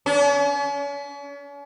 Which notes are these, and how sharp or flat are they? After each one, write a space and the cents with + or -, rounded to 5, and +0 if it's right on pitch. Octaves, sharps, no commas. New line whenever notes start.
C#4 +40